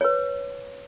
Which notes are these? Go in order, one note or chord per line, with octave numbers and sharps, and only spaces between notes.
B4 C#5